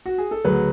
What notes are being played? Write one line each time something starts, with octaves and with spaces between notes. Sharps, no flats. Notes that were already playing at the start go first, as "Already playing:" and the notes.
F#4
G#4
A4
D2 C#3 F#3 B4